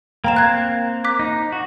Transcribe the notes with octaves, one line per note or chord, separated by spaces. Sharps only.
A#3 C4 G5 A#5 E7
F#6 G#6
D6 F#6 B6
D#4
F#4